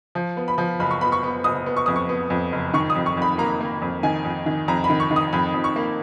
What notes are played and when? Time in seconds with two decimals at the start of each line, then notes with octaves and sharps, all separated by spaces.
0.15 F3
0.37 B3
0.48 B5
0.58 F3
0.80 F#1 B5
0.91 C#6
1.01 B3 B5
1.12 C#6
1.23 B3
1.44 F#1 D#6
1.66 B3
1.77 C#6
1.86 F2 D#6
1.96 C#6
2.09 B3
2.30 F2
2.52 F#1
2.74 D#3 C#6
2.90 D#6
2.95 F2
3.06 C#6
3.17 F2 B5
3.38 A#3 A#5
3.61 A#3
3.82 F2
4.03 D#3 G#5
4.25 F2
4.46 D#3
4.68 F2 A#5
4.84 B5
4.90 D#3
5.00 C#6
5.11 D#3
5.16 D#6
5.33 F2 B5
5.54 F2
5.64 C#6
5.76 A#3